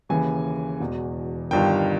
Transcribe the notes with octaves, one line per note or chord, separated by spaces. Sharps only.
D#2 C#3 E3 G#5
E1 E2 B2
G1 G2 D#3 G5